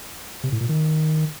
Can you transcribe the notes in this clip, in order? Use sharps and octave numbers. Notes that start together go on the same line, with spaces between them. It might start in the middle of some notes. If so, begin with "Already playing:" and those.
C3
A2
A#2
D#3